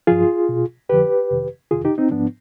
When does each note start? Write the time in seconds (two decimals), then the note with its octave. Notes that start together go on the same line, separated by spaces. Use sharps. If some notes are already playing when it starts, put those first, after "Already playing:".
0.07 G2 F3 F4 G#4
0.49 B2
0.89 F2 D3 F3 G4 B4
1.30 F2 C3 D#3
1.71 F2 C3 D#3 F4 G#4
1.85 D#4 G4
1.98 C4 D#4
2.11 G#2 F3 B3 D4